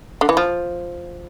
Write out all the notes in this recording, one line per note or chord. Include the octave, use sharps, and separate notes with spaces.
D3
E3
F3